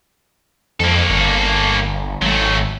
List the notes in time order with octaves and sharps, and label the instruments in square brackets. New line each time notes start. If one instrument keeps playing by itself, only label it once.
[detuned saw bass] F2 [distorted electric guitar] A#3 A4
[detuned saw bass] G1
[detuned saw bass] G#1 [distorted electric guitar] F#3 A3